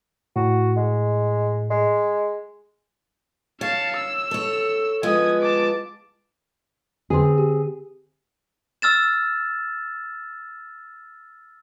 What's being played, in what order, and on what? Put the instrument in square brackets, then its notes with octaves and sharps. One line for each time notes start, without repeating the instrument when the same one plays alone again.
[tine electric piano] A2 [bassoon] F#4
[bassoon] G#3
G#3
[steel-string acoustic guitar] C#5 [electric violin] F5 A5
[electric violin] E6
[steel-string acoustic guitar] A4 C#5
[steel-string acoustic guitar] F3 G#3 B3 [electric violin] D#6 G#6
[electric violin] A5 D6
[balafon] D3 C6 [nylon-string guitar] C4 G#4
[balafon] G4
[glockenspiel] E6 F6 A6 E7